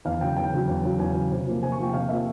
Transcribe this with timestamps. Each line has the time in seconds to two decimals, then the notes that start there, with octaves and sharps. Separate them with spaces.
0.05 E2 F5
0.21 C#3 F#3 G5
0.36 E2 G5
0.53 C#3 F#3
0.67 E2
0.83 C#3 F#3
0.99 E2 G#5
1.15 C#3 F#3
1.31 C3
1.46 F3 A#3
1.62 C3 G#5
1.72 C#6
1.78 F3 A#3 G5
1.93 C3 F5
2.09 F3 A#3 E5